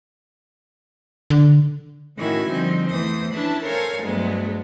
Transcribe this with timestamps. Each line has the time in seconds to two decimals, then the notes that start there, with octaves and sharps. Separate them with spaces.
1.30 D3
2.17 A2 D#3 C#4 E4 F#4 G#5
2.49 D3 F3 G3 C4 D#4
2.90 E2 E3 A3 C5 D#6
3.33 C#4 D4 E4 B4 A5
3.65 A4 A#4 C5 C#5 F5 G#5
4.03 D2 G2 F#3 G#3 A3 B3